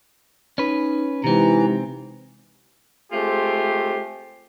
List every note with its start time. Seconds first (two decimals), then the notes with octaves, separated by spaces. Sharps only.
0.58 C#4 D#4 B4
1.24 C3 E3 G#3 C4 D#4 G4 A#5
3.12 G#3 A3 C4 F4 G4